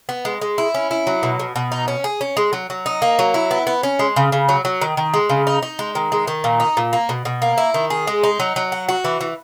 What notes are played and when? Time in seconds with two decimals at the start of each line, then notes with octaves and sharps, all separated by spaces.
0.09 B3
0.25 G#3
0.41 G#3
0.58 E4
0.74 C#4
0.91 E4
1.07 F#3
1.23 B2
1.39 B2
1.56 B2
1.72 D#4
1.88 C#4
2.04 G#4
2.21 C#4
2.37 G#3
2.53 F#3
2.70 F#3
2.86 D#4
3.02 A#3
3.19 F#3
3.34 E4
3.51 B3
3.67 B3
3.83 C#4
3.99 G#3
4.16 C#3
4.32 C#3
4.49 F#3
4.65 F#3
4.81 D#3
4.97 D#3
5.14 G#3
5.29 C#3
5.47 D#4
5.62 D#4
5.79 G#3
5.95 D#3
6.12 G#3
6.27 D#3
6.44 A#2
6.60 D#4
6.77 A#2
6.93 A#3
7.09 B2
7.25 B2
7.42 A#3
7.58 E4
7.74 D#3
7.90 G#4
8.07 G#3
8.23 D#4
8.40 F#3
8.56 F#3
8.72 F#4
8.88 F#4
9.05 E3
9.21 E3